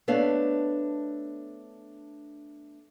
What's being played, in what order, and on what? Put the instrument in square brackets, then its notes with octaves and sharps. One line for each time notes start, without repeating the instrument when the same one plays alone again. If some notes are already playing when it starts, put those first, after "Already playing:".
[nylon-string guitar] A3 B3 D4 C#5 F5